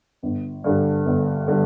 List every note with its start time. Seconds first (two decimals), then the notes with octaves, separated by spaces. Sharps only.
0.23 G1
0.64 G2 D3 G3
1.06 G1
1.48 D3 G3